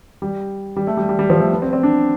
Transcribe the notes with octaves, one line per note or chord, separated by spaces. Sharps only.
G3
G3
A3
G3
G3
G3
F3
A3
B3
C4
C4
D4